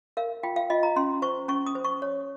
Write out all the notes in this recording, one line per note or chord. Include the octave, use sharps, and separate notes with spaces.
A#4 F5
F4 G5
F5
F4 D#5
A#5
C#4 C6
C5 C#6
C#4 C#6
D#6
C5
C#6
C#5